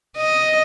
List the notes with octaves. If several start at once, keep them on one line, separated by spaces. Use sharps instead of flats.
D#5